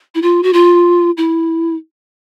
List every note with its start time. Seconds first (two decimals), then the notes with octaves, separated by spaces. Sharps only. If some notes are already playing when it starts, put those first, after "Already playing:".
0.15 E4
0.22 F4
0.43 F#4
0.53 F4
1.17 E4